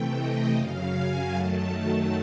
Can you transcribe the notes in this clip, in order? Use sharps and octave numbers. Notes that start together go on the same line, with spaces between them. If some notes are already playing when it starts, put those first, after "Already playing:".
Already playing: C3 E3 A3 G5
D#5
F#2 C#3 F#3 F5
G#5
F#2 D#3 F#3 A3 A5
A5